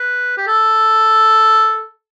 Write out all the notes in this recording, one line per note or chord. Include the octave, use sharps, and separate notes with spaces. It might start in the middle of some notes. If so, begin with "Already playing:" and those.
Already playing: B4
G4
A4